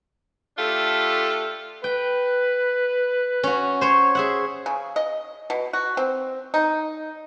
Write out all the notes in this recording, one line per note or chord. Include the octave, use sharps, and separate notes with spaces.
A3 D4 F4 G4 A4
B4 G5
C#4 F#4
C5 C#5
G#4 E5 F#5
C#3
D#5
B2
F#4
C4
D#4